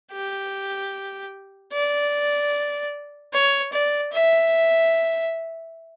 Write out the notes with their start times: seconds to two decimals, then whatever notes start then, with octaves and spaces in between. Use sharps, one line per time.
0.12 G4
1.73 D5
3.33 C#5
3.73 D5
4.13 E5